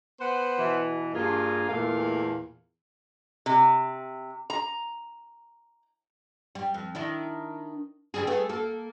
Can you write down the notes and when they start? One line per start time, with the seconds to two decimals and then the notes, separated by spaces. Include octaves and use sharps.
0.21 B3 C5 F#5
0.58 B2 E3
1.14 G2 A#3 F4 G#4
1.69 E2 A#2 A3 A#3 F5
3.46 C3
4.50 A#5
6.55 G3
6.74 F2
6.95 D#3 D4 E4
8.14 D3 G3 G#4
8.27 A3 B3 G#4
8.49 A#3 A4